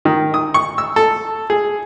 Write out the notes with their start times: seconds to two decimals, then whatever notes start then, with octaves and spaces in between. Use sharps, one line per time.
0.05 D#3
0.34 D#6
0.54 C#6
0.78 E6
0.96 A4
1.50 G#4